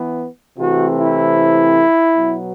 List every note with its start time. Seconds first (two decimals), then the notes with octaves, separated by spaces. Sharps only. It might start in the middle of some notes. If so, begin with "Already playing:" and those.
Already playing: E3 B3
0.58 C3 E3 A3 C4 F#4
0.97 E4
2.15 B2 F#3 B3